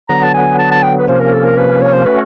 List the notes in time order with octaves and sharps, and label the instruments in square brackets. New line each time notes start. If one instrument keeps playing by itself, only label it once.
[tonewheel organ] D3 F#3 B3 [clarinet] A#5
[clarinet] A5
G#5
A5
A5
G5
B4
[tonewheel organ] C3 F3 A#3 C#4 [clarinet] C5
[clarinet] A#4
A4
A#4
B4
C#5
C5
[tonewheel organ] A3 C#4 F#4 [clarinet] B4